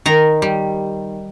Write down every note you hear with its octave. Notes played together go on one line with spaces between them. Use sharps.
D#3 A#5
G3